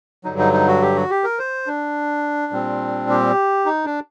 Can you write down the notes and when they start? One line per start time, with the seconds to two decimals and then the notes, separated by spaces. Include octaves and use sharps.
0.24 G2 D3 F#3 D#4
0.39 D#4
0.53 D#4
0.68 F#4
0.82 G4
0.96 F#4
1.10 G4
1.24 A#4
1.39 C5
1.67 D4
2.52 A#2 G3 C4
3.10 G4
3.66 D#4
3.85 D4